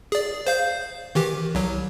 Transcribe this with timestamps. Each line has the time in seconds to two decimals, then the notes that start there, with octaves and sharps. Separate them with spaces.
0.12 G#4 D5
0.47 C5 F5 G6
1.15 D#3 E3 G4
1.55 C2 F#3